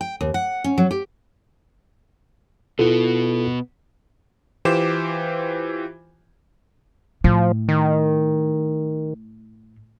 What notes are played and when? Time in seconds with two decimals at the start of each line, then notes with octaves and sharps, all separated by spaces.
0.01 G5
0.21 D#2
0.34 F#5
0.64 C#4
0.78 F#3
0.91 G4
2.79 B2 B3 E4 F4 A4
4.65 E3 F4 G4 C5 D6 E7
7.24 A2 F3
7.68 D#3